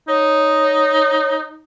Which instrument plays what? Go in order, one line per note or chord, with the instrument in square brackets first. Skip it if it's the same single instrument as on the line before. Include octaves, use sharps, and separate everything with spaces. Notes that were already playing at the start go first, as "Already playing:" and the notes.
[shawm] D#4 [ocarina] C#5